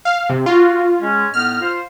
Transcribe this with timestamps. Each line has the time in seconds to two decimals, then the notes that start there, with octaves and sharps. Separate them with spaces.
0.05 F5
0.30 C3
0.46 F4 F#4
1.01 G#3 C#4
1.34 A2 B3 D#4 F6
1.60 F4 C5